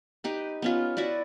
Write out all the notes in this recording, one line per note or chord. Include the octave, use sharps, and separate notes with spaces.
D#4 G4 B4
B3 C#4 F4
E4 F#4 B4 D5